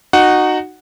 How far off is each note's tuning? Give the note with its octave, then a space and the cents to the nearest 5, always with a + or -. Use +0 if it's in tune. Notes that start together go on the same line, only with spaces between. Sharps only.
D#4 -20 F#4 +0 F#5 +0